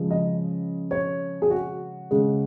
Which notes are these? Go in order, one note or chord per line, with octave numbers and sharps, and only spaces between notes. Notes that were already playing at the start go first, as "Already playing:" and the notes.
Already playing: C#3 F3 G#3
D#5
C#5
G#4
F#4
C#3 G#3